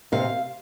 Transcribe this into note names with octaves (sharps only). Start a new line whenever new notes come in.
C3 F5